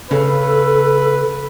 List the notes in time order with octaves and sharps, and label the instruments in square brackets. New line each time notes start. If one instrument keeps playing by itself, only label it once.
[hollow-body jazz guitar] C#3 [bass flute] A4 [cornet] B4